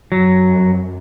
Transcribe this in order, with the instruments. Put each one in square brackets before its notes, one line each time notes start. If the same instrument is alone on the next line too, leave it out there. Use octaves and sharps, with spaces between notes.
[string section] F#2 [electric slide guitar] F#3